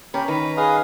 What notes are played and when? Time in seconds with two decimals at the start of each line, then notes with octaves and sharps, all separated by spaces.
0.14 C#4 G4 A#4 B5
0.28 D#3 B4 A#5
0.57 G#4 B4 D#5 F5